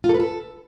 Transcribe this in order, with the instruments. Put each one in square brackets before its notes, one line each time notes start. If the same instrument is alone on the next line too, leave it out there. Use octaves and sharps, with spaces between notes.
[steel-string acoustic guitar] F4
A4
B4
A4